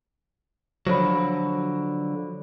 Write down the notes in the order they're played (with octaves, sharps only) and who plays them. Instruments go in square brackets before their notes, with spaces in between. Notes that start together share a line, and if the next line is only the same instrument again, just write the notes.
[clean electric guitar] D3 F3 F#3 [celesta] C5 C#5 B5